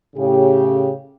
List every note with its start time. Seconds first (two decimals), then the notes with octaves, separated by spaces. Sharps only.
0.16 A2 C#3 G4